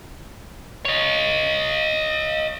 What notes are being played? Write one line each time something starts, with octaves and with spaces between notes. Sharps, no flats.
C#5 D#5